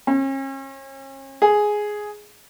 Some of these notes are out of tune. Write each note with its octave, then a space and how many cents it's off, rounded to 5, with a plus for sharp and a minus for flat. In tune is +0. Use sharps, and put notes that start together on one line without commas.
C#4 -40
G#4 +5